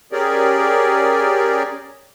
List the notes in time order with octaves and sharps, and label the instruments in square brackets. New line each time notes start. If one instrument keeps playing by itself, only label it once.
[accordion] C#4 G4 G#4 A#4 D5